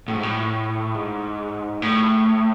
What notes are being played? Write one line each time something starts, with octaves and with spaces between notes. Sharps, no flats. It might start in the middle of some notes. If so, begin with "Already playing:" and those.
A2
G#2
A2
G#2
A2